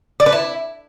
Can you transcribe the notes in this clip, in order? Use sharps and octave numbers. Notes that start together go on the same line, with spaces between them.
D5
B4
E4